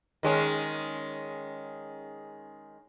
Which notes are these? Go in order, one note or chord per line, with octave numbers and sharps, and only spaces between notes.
D#3 G#3 C#4